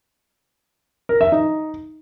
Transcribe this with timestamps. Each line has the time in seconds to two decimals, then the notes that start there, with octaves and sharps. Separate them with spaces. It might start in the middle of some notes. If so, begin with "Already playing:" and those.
1.09 A#4
1.21 E5
1.32 D#4